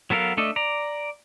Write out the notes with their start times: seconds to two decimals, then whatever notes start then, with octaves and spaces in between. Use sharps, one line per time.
0.10 F#3 B3 A4 A#4 F5
0.37 A3 D4 A4 D#5
0.56 D5 A#5